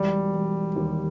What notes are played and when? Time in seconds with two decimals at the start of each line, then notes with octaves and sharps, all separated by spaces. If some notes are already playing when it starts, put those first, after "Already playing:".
Already playing: E1 G3
0.33 E1
0.76 D#2